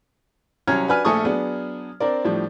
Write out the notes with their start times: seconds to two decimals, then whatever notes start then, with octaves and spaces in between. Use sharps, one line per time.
0.67 C2 F#3 C#4 A#5 F6 G#6
0.88 D4 F#4 B4 G#5 F6
1.05 A#1 A3 A4 G#5 C#6 D#6
1.25 F#3 B3 D4 G#4
2.00 C4 D4 A#4 D5
2.25 A2 F3 G3 D4